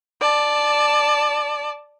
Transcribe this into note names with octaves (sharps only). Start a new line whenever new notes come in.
D5 A5